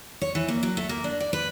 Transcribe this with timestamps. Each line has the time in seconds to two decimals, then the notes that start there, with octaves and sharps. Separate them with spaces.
0.21 C#5
0.35 E3
0.48 A#3
0.63 F#3
0.77 A3
0.89 A#3
1.04 D4
1.20 D5
1.33 B4